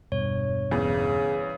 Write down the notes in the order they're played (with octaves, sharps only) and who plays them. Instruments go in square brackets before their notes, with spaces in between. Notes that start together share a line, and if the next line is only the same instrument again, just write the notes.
[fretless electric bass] E1 G2 B2 [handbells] C#5
[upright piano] E2 [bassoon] C#3